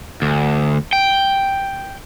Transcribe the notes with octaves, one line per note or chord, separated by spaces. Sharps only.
D2
G5